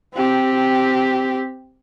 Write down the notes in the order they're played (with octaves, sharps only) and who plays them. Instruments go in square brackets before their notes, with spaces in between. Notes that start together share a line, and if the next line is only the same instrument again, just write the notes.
[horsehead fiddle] C4 G4